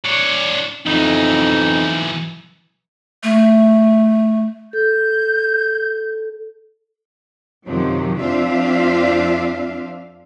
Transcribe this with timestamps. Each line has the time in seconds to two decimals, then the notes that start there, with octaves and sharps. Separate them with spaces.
0.04 D4 C#5
0.86 B1 F2 E3 D#4
3.23 A3
4.73 A4 G6
7.66 F#2 C3 D#3 F3 F#3
8.19 F2 C4 D4 F4 E5 F5